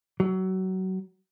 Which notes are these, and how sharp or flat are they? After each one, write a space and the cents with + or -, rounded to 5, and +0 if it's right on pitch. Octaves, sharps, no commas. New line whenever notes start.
F#3 +25